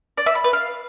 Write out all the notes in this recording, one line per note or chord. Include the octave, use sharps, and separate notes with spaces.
D5
E5
B5
B4
F5